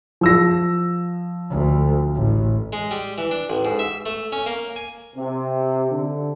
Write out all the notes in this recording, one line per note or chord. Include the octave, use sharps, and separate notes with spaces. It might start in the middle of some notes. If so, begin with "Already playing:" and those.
F3 E6 A#6
D2
A1
G#3
G3
E3
D4
A1
G#2
E5
A3
C#4
A#3
G#5
C3
D3